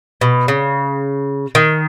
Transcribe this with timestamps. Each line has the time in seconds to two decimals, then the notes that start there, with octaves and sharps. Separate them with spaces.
0.21 B2
0.48 C#3
1.55 D#3